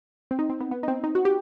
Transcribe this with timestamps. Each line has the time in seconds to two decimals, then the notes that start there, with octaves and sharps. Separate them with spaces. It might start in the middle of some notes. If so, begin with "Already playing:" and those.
0.31 C4
0.39 D#4
0.50 C4
0.60 B3
0.71 B3
0.83 D#4
0.88 C4
1.04 D#4
1.15 F#4
1.25 G4